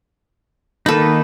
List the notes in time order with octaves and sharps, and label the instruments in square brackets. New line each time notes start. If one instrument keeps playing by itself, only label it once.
[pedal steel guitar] D#3 A#3 D#4 [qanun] A4 B4